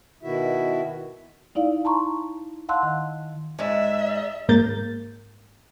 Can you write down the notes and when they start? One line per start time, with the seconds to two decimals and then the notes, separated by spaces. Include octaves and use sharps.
0.23 B2 D#3 E4 F#4 E5
1.55 D#4 E4 D5 F5
1.85 A5 A#5 C6 C#6
2.69 F5 F#5 A5 C6 E6 F#6
2.83 D#3
3.59 G#2 G#3 D5 E5
4.49 G#2 A#3 A#4 G6 A6